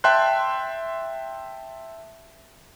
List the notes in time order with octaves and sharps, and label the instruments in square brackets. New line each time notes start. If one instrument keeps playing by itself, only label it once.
[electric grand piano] E5 G5 A5 C6 F#6